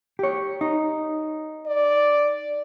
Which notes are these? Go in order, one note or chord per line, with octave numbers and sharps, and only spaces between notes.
G4 C#5
D#4
D5